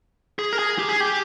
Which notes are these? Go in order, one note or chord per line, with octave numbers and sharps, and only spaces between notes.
G#4
A#4
G#4
G4
G#4
G4